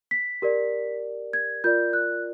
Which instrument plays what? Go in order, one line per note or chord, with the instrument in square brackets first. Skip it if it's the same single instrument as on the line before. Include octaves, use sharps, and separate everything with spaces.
[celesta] B6
G4 A#4 D5
G#6
F4 A#4 D5 G6
F#6